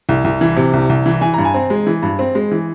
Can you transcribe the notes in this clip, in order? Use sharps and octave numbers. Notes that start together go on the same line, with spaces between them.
C2
C2
E3
C3
C2
C2
E3
E3 G#5
G2 A#5
G#5
C4
G#3
E3
G2
C4
G#3
E3